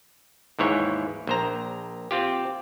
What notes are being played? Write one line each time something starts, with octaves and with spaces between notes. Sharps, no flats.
D#2 G#2 E3 C#5
A#1 C5 A#5
C4 F4 G4